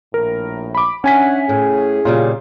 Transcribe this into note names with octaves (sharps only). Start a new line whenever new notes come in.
A#1 A2 A#4
B5 D6
C#4 D4 E5 F#5 G#5 B6
A2 G#4
A#2 C#3 G3 F4